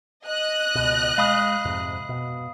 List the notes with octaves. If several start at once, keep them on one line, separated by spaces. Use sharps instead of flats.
D#5 F#6
C#2 B2
G#3 F5 B5 D#6
F2 G#2 C3
B2